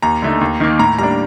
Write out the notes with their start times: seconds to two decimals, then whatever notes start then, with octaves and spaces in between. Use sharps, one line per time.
0.03 D#2 A#5
0.22 D3 A3 D#4
0.41 D#2
0.60 D#3 A#3
0.79 A2 A#5
0.98 G3 A#3 D4 A#5